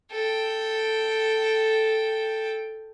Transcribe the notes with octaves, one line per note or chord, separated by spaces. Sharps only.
A4 G5